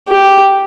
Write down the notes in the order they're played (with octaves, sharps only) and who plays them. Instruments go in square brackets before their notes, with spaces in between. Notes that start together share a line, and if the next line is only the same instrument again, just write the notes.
[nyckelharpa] G4